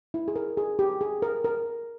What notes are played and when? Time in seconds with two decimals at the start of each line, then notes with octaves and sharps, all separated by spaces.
0.14 E4
0.28 G#4
0.36 A#4
0.57 G#4
0.79 G4
1.01 G#4
1.22 A#4
1.44 A#4